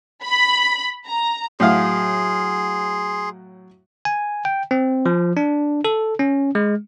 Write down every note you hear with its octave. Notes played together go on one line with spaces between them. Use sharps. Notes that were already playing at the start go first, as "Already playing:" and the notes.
B5
A#5
A2 F#3 G#4 F5 F#5 C6
G#5
G5
C4
F3
D4
A4
C#4
G#3